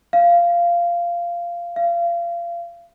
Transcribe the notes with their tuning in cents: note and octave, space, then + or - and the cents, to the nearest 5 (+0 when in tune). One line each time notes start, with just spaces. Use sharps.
F5 -15
F5 -30